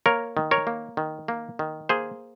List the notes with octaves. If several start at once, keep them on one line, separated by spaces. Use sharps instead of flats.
A#3 A#4 C#5
D#3
A#4 C#5
A#3
D#3
A#3
D#3
A#3 G#4 C5